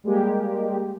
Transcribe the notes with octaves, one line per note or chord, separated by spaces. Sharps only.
G3 G#3 A#3 G4